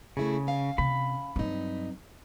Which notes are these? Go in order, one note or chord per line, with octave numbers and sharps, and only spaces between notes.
C#3 A3 E4 G#4
C#4 E5 F5
C3 B5
G2 F#3 C4 D#4